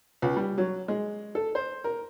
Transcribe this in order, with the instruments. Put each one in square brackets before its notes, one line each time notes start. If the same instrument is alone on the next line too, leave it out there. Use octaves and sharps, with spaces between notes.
[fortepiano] C#2
G3
F#3
G#3
A4
C5
A#4